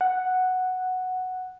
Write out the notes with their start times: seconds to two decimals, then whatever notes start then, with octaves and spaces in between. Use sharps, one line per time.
0.01 F#5